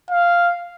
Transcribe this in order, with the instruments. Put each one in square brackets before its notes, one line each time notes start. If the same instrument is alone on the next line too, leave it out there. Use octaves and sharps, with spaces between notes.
[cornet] F5